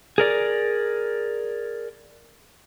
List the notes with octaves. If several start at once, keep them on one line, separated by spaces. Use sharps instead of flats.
G#4 A#4 D5